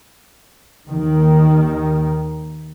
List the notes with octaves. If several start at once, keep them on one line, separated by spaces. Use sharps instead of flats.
D#2 D#3